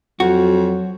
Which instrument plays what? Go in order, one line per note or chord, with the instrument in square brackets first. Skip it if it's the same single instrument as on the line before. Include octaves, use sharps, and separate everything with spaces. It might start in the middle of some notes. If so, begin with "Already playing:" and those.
[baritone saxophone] F2 [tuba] F#3 [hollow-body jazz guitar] F#4